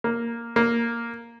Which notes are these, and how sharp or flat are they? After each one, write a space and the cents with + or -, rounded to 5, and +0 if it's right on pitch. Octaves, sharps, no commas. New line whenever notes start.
A#3 +0
A#3 +0